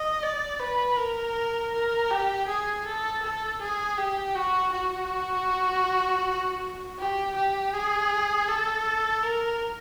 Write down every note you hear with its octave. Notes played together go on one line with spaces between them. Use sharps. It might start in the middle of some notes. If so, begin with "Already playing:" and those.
Already playing: D#5
D5
B4
A#4
A#4
G4
G#4
A4
A4
G#4
G4
F#4
F#4
G4
G4
G#4
A4
A#4